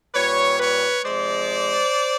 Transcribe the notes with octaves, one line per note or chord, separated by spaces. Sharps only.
A#2 G3 B4 C#5
B4 C#5
C3 F3 G#3 C5 D5